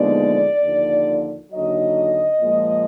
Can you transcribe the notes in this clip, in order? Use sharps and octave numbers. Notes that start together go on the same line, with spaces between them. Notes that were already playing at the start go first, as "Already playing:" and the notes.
Already playing: D#2 D3 F3 G#3 B3 D5
D#2 D3 F3
D#2 D3 F#3 D#5
A#2 F3 G#3